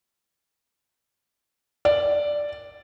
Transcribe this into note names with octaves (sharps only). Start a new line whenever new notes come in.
D5